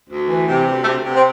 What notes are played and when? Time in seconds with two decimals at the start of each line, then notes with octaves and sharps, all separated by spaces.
0.10 D2
0.29 E3
0.48 C3
0.66 D2 G3
0.80 A3
0.85 C3
0.95 A3
1.04 C3 B3
1.16 C4